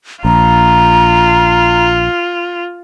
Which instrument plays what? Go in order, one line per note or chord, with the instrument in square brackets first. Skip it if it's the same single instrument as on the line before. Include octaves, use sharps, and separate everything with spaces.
[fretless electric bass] A#1 [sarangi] F4 [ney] A#5